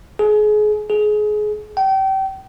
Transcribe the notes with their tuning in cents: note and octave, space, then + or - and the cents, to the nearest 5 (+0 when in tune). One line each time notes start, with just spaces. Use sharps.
G#4 +30
G#4 +25
G5 -30